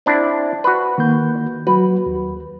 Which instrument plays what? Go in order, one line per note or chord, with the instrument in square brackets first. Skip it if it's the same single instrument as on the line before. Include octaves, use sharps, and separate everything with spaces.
[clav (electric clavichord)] C4 D4 E4
F#4 B4
[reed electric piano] D#3 A#3 G6
[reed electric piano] F#3 F#4 [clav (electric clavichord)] B4
[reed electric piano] D#2